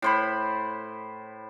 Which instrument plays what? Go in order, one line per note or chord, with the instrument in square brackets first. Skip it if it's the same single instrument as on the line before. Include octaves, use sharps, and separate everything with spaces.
[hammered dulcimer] A2 C5 B5